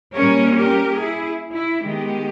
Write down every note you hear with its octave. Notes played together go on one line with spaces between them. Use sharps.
A#2 G3 A#3 C#4 A#4 C#5
G4 A#4
E4 G#4
E4
D#3 G#3 B3 G4